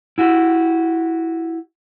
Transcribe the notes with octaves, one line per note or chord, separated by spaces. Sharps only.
E4 F#4 G4